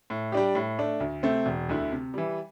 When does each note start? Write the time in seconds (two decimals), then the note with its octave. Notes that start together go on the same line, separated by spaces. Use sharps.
0.10 A2
0.32 G3 D4 G4
0.55 A2
0.78 A3 D4
1.00 D2
1.23 C3 A3 C4
1.45 E1
1.69 D2 D3 A3 E4
1.92 C3
2.14 E3 G3